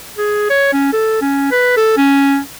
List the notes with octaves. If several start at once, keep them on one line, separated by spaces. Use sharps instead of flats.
G#4
C#5
C#4
A4
C#4
B4
A4
C#4